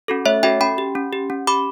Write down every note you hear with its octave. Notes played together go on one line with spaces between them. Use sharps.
C#4 F#4 A4
A3 C#5 E5
C#4 F#4 A4 E5 G5
C#4 G5 B5
G4
C#4
G4
C#4
G4 B5 D6